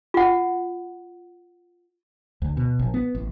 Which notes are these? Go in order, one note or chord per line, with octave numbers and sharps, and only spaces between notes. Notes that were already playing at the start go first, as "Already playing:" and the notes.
F4 F#5
D2
B2
A#1
B3
A1